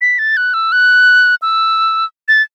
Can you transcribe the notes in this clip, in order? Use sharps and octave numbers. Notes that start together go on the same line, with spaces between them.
B6
A6
F#6
E6
F#6
E6
A6